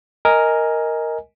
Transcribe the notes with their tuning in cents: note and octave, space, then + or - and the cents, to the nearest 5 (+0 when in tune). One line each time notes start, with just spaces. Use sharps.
A#4 +0 D#5 +10 G#5 +0